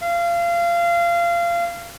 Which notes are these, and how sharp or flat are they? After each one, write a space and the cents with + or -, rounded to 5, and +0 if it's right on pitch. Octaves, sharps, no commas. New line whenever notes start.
F5 -25